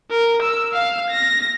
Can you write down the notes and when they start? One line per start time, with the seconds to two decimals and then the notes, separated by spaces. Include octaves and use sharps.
0.10 A#4
0.42 E6
0.73 F5 F6
1.11 A#6